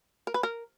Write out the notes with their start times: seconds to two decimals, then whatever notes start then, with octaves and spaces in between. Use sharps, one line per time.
0.27 A#4
0.34 B4
0.43 A#4